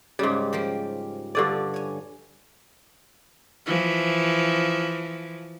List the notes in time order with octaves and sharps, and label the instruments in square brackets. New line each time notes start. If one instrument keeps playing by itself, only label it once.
[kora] G#2 G3 [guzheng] C#3
[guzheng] F3 A#3 G4
[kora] G2 D3 D5
[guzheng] C#5 G#5
[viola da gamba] E3 F3